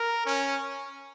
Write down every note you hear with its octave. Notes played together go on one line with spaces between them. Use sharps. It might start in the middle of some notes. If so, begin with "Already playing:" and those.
Already playing: A#4
C#4